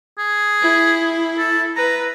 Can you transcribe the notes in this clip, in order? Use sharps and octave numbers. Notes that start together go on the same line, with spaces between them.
G#4
E4
A4
B4 A#5